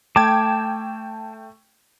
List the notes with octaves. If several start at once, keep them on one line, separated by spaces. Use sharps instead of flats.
A3 G5 A5 D6 G#6